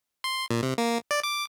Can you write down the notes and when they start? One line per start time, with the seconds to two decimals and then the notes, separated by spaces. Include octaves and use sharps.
0.24 C6
0.51 A#2
0.63 C3
0.78 A#3
1.11 D5
1.23 D6